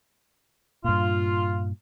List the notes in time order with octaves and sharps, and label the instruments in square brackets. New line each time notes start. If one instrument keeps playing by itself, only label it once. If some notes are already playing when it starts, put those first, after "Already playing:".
[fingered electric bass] G2 A#2 [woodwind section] F4